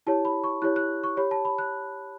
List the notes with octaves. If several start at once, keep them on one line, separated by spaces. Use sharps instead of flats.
E4 G4 C#5 A5
B5
C#6
E4 G4 C#5 F#6
F#6
C#6
G4 C#5 B5
A5
B5
F#6